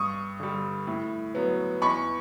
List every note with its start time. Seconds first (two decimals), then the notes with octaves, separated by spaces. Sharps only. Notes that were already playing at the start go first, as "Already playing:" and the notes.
Already playing: G2 C#6 D#6
0.40 D3 G3
0.87 A2
1.35 F#3 B3
1.82 E2 B5 C#6